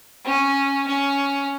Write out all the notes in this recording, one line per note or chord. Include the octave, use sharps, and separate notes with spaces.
C#4
C#4